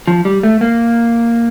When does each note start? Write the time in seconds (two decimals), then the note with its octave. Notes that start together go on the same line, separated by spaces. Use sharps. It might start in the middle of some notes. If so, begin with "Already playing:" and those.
0.07 F3
0.25 G3
0.43 A3
0.61 A#3